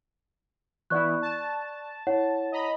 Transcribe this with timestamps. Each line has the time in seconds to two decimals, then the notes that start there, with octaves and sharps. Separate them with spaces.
0.90 E3 B3 E4 D5 C#6 F#6
1.22 A5
2.07 E4 C#5 F#5
2.52 D#5 A#5 B5